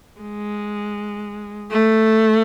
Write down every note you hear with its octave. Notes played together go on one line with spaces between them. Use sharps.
G#3
A3